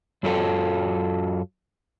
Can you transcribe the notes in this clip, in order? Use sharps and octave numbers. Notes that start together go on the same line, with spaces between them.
F#2 F#3 F4 A4 G5